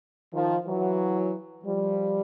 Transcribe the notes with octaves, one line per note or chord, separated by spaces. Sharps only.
D#3 F3
E3 F#3
F3 G3